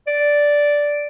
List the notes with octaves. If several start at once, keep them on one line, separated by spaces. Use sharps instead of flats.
D5